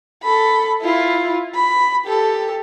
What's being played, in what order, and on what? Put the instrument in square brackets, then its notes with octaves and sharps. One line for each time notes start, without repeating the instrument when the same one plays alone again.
[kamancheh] A4 B5
E4 F4
B5
G4 A4